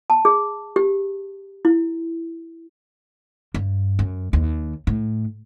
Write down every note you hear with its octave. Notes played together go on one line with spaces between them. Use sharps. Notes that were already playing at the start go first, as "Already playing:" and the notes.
A5
G#4
G4
E4
G2
F#2
D#2
A2